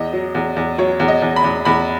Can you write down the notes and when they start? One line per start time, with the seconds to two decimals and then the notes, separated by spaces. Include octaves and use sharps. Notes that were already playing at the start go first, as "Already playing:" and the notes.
Already playing: E2 D#5
0.13 F#3
0.35 E2
0.57 E2
0.78 F#3 C#5
1.00 E2
1.08 D#5
1.22 E2
1.36 B5
1.44 E2
1.65 E2 B5